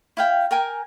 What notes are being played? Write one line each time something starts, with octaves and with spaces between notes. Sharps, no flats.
E4 F5 G5
A#4 G5 G#5 A#5